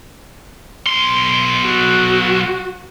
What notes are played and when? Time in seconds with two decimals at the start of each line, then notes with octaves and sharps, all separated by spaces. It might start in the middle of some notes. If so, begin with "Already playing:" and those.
0.87 B1 C6
1.66 F#4